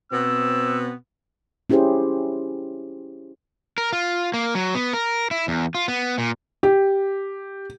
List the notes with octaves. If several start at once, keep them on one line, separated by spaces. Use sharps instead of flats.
B2 B3 C4 E6
C#4 E4 G4 G#4 C5
A#4
F4
A#3
F#3
B3
A#4
E4
E2
F4
B3
A#2
G4